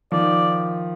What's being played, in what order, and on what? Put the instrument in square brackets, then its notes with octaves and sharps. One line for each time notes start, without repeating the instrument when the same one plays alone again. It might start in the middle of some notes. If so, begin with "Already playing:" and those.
[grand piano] D#3 F3 [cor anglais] D5